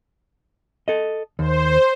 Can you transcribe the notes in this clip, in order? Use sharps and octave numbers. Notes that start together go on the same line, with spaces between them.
A4 D#5
D#2 C5